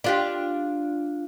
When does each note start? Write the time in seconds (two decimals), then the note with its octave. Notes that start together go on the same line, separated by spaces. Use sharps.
0.04 D4 F4 G4